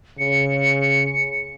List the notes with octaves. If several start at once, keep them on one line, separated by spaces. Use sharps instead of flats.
C#3 C#7